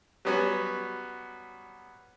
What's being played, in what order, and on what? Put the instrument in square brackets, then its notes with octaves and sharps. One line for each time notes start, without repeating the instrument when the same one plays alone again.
[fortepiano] F#3 G3 B3 C#4 F#4